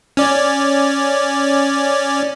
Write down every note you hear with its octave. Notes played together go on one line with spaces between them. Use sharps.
C#4 D5